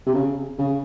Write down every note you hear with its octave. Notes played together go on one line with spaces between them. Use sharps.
C3
C#3
C#3